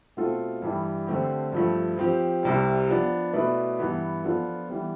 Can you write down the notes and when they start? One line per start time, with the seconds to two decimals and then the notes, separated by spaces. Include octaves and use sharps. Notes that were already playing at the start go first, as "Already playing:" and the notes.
0.17 B2 A3 C4 F4 A4
0.62 G2 E3 G3
1.07 D3 A3 C4 G4
1.52 G2 F3 A3
1.98 F3 C4 G4
2.43 C2 C3 G3
2.88 F3 B3 D4
3.33 B2 A3 E4 B4 D5
3.79 G2 E3 B3
4.24 F3 B3 D4 F4 A4
4.69 E3 G3 B3